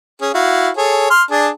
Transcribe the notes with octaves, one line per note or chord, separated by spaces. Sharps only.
C#4 G#4
E4 F#4 F5
G#4 A4 C#5
C6 F6
D4 G#4 A5